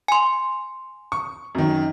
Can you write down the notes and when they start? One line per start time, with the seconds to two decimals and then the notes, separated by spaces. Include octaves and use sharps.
0.08 G#5 C6
1.12 C#6
1.55 F#2 D#3